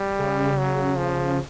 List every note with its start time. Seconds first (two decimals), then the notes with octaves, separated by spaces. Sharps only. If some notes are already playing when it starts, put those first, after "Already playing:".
Already playing: G3
0.19 C#3
0.59 F#3
0.98 F3